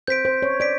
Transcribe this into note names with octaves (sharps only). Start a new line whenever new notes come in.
C5 G6 B6 D7
C5
C#5
D5 B6 D7